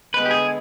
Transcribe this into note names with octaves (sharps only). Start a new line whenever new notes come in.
D3 G#3 B3 B4
G4
G#4